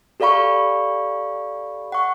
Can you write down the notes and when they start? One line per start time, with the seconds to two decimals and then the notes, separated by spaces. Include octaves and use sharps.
0.20 G4 A4 D5 F5 B5 C#6
1.92 F#5 C#6